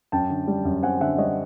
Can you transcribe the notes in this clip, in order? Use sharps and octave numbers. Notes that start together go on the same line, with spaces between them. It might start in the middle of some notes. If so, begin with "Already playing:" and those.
F#2 G5 A5
D3
G3
F#2
C4 F#5 G#5
D3 E5 F#5
G3 C#5 D#5